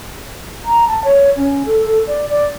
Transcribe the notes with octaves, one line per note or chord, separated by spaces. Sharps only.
A#5
A5
C#5
C#4
A4
A4
D5
D5